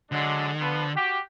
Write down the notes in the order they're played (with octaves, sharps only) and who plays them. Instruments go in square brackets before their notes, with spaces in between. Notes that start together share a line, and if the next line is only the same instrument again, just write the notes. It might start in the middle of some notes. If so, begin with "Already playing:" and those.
[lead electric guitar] D3 [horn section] F#3 G#3 D4
[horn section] F3 B3
F#4 G4